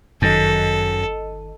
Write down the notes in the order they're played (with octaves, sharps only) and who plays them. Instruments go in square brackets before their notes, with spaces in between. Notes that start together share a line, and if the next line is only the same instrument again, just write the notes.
[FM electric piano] G1 D#3 D#5 [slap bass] F#2 [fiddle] A4